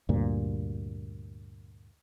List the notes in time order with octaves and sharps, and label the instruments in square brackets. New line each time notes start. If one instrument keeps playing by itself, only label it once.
[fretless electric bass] D2 G2 A#2